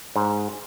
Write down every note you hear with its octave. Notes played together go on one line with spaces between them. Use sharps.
G#2